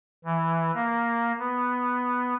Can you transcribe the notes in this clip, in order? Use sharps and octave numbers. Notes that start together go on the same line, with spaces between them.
E3
A#3
B3